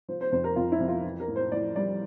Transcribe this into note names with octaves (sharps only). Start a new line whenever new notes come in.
F3 C5
C5
F2 C5
A#4
F2 F4
E4
F2
F4
E3
A#4
A2
C5
A2 D5
G3 D5